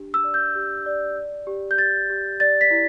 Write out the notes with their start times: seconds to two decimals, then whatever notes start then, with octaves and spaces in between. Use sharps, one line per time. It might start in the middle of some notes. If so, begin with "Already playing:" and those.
Already playing: D4 G4
0.14 E6
0.24 D5
0.34 G6
0.55 G4
0.86 D5
1.16 D5
1.47 G4
1.71 G6
1.78 G4 A6
2.10 G4
2.40 D5 A6
2.61 B6
2.71 E4